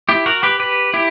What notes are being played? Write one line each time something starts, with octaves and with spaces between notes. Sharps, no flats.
E4 G4
F#4 A#4
G4 B4
G4 B4
E4 G4